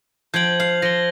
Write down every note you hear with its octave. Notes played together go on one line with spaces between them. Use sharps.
F3 G5 G6 G#6 F#7
F5
F3 A#6 G7